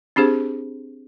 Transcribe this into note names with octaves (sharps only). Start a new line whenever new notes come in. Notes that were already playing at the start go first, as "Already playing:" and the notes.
C4 D4 G4 G#4 C5